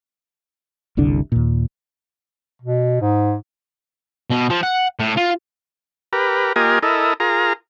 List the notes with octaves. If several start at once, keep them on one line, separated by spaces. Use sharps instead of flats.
F#1 C2 D3 D4
D#2 A#2
B2
G#2
B2
F3
F#5
A2
F4
G4 A#4 B4
A#3 F4 G4 A#4 D#5 G#5
E4 A4 A#4 D#5
F4 G#4 A#4 A#5